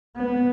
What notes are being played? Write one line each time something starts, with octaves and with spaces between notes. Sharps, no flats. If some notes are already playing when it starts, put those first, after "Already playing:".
B3